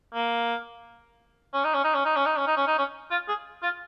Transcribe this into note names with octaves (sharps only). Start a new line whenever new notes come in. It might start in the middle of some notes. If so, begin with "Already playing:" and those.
A#3
C#4
D#4
C#4
D#4
C#4
D#4
C#4
D#4
C#4
D#4
C#4
D#4
C#4
F4
G#4
F4